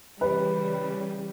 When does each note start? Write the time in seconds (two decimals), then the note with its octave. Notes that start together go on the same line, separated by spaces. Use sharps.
0.21 C#3 E3 G3 B4